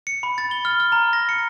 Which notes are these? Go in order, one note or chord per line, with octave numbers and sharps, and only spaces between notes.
C#7
B5
A6
G7
F6
F6
A#5
A#6
C#7